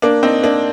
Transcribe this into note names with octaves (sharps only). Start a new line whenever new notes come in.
A#3 D4
C4 D#4
A#3 D4